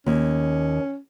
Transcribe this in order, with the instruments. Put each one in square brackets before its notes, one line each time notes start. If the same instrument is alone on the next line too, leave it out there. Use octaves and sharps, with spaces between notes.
[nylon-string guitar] D#2 [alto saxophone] C#4